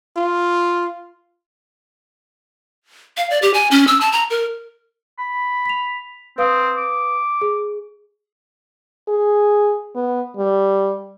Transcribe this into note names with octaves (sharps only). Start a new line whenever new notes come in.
F4
F5
D5
G4
G#5
C#4
E6
A5
A#5
A#4
B5
B6 F7
C4 B4 F5 D#6
D6
G#4
G#4
B3
G3